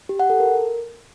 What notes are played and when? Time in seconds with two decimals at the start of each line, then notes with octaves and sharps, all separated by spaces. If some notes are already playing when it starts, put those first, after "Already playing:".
0.09 G4
0.19 F#5
0.30 A4
0.40 A#4